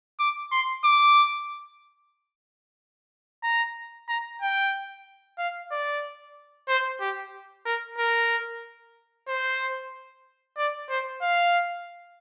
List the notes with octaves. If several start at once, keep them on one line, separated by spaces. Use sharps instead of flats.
D6
C6
D6
A#5
A#5
G5
F5
D5
C5
G4
A#4
A#4
C5
D5
C5
F5